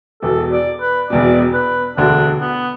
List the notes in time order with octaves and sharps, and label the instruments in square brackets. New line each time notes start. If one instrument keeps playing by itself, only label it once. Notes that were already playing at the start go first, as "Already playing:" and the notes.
[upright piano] E1 E2 B2 [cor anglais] A4
[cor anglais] D5
B4
[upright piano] E1 E2 B2 [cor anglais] D5
[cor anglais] B4
[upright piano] E1 D2 D3 [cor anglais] D4
[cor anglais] B3